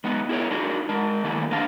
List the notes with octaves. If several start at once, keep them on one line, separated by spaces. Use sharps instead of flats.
G#3 B3 D#4
E4 G#4 A#4 C#5
D4 D#4 F#4 A#4
G#3 A#4
D#3 E3 G3 A3 A#3
A#3 C4 D4 F5 A5